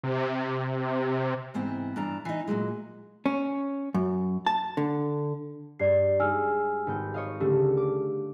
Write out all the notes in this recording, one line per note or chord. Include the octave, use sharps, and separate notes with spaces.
C3
G#2 E3 B3 C4
G2 E3 D4 A#5
E3 D#4
A#2 D3 F#3 G#3
C#4
F#2
A5
D3
G2 D5 C7
G#3 D#4 G#5 E6 F6
G#1 B3 G6
C#5 D#5 F5
C#2 D3 A3 G4
D6